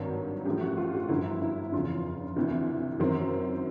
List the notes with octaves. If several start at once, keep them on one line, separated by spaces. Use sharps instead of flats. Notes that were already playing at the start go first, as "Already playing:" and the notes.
Already playing: G#1 G2 D#3 F#3
A1 A2 F3 G4
F#4
F4
F#4
G1 F#2 D3 F3 E4
E4
F1 E2 C#3 F4
D2 C3 E3
F#1 F#2 D#3 F#3 C4